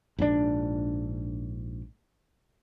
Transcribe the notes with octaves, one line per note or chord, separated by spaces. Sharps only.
A#1 G#2 B2 D4